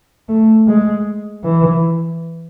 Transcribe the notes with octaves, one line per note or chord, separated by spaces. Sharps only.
A3
G#3
E3